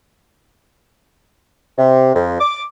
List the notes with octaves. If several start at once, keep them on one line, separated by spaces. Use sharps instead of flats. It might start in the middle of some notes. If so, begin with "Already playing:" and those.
C3
F2
D6